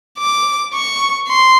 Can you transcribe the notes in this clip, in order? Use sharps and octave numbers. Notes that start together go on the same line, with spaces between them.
D6
C#6
C6